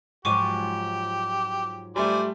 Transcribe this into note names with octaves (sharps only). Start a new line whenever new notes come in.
G#2 F3 F#3 G4 C#6 D6 D#7
G3 A3 C5 D5 G#5